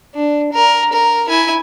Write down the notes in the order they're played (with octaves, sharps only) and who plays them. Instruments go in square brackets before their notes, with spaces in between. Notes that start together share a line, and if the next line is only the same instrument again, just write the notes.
[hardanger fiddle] D4
A#4
A#4
E4 G#5